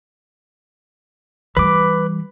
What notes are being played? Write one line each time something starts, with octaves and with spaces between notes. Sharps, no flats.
E3 G3 B4 D6